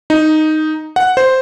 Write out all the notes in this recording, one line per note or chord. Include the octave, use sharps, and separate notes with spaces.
D#4
F#5
C5